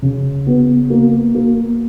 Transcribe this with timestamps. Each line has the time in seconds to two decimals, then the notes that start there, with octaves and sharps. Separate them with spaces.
0.02 C#3
0.47 B3
0.90 A#3
1.35 A#3